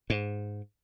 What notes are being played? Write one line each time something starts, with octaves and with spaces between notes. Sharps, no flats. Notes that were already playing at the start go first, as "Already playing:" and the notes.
G#2